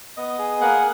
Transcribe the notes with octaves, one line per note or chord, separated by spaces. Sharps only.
B3 D#5
G#4
A#3 F#5